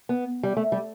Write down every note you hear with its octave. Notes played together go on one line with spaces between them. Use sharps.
B3
G3
A3
G3